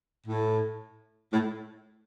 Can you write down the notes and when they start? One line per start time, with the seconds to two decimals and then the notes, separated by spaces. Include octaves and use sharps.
0.26 A2
1.32 A2